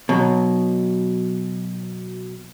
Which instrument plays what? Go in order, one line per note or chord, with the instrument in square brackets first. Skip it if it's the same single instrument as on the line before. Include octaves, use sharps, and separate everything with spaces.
[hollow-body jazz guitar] B2 F#3